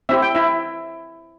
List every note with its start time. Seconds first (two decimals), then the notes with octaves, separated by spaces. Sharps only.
0.09 C4 E4 G4 E5
0.22 G5
0.35 E4 E5